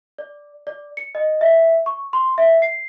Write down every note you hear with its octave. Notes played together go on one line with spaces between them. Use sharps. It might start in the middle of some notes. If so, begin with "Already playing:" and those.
D5
D5
C#7
D#5
E5
C#6
C6
E5
C7